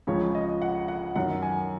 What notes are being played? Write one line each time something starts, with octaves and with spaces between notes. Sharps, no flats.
C#2 C#3 F3 G#3 C#5
D#5
F#5
F#5
F#2 D#3 F#3 F#5
G#5